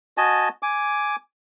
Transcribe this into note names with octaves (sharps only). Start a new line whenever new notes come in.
F#4 D#5 G#5 A5
G#5 D6